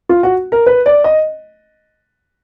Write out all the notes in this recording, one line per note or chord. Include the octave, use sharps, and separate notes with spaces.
F4
F#4
A#4
B4
D5
D#5